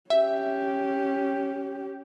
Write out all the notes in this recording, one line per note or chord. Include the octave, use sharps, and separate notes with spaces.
C#4 G4 E5